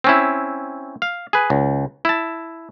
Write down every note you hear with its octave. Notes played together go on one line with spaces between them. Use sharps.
C4 C#4 E4
F5
G#4 B4
C#2
E4 A5